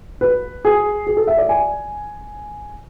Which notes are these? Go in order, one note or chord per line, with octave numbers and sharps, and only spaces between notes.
B4
G#4
G#4
A4
E5
D5
G#5